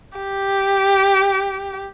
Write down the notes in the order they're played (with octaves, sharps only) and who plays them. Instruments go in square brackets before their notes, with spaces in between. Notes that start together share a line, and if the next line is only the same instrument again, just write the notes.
[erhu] G4